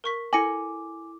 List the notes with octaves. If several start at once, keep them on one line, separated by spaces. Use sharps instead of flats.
A#4 C#6 B6
E4 A4 G#5 D6 A#6 C#7